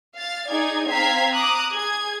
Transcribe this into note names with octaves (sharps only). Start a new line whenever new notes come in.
F5 A6
D#4 G#4 D5 G#6
C4 F5 A#5 G#6 B6 C7
A#5 D6 D#6 F#6
G#4 G#6